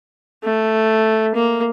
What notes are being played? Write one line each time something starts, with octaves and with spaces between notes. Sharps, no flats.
A3
A#3